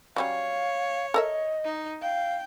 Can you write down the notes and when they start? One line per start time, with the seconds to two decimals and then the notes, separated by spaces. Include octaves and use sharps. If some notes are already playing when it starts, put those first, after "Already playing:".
0.16 F#3 G3 C#4 C#5 F5
1.14 A4 A#4 D#5 E5
1.65 D#4
2.02 F5 G5